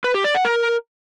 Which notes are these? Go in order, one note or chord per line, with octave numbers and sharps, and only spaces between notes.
B4
G4
D5
F#5
A#4